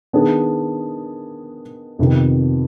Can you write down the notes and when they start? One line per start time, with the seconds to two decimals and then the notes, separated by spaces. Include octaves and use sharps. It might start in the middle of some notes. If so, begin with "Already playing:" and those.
0.13 D#3 B3 D4 G#4
1.99 F2 C3 D#3 B3